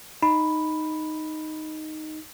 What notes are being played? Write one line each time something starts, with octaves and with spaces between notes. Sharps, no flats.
D#4 B5